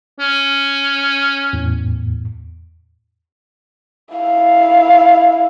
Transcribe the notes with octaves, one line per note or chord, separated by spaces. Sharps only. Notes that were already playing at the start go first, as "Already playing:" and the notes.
C#4
E2 A2
E4 F5